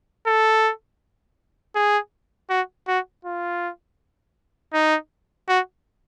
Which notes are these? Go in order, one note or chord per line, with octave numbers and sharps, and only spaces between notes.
A4
G#4
F#4
F#4
F4
D#4
F#4